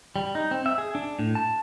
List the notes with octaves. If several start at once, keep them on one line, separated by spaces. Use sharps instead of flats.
G3
D#4
C4
E5
G#4
D4
A2
A5